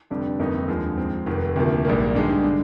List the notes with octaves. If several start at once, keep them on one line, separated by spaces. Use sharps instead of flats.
F1 F2 D3 G3 D4
G1 F2 D#3 A#3 D#4
D#2 D3 F3 G#3
G#2 F3 C4
F1 F2 D#3
D2 C3 F3 A#3
A#1 G#2 G3 A#3
G2 D3 G#3 D#4 G4
D3